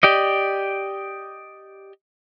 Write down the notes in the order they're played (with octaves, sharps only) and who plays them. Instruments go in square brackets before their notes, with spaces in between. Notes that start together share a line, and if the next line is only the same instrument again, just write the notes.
[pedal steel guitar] G4 D5 D#5